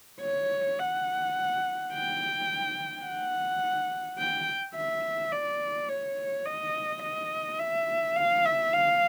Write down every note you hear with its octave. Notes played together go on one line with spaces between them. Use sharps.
C#5
F#5
G5
F#5
G5
E5
D5
C#5
D#5
D#5
E5
F5
E5
F5